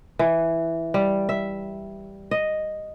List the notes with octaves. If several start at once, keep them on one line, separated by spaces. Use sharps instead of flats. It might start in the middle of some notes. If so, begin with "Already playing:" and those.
E3
G3
E5
D#5